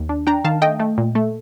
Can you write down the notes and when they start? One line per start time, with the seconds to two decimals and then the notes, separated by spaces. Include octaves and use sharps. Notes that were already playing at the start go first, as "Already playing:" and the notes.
Already playing: D#2
0.09 D4
0.27 D4 G5 A#5
0.44 D#3 F5 A5
0.62 A3 D#5 G5
0.80 A3
0.98 A#2
1.15 A3